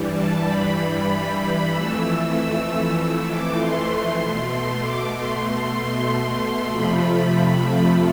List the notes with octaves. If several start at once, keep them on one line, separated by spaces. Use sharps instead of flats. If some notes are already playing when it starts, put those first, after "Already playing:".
Already playing: G2 E3 G3
A5
B5
F2 E3 A3 E6
E6
D6
C6
B2 A3
D6
C6
F2 C3 F3 A3 B5